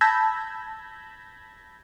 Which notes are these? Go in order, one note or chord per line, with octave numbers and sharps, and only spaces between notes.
A5 B5 E6 G6 G#6 A#6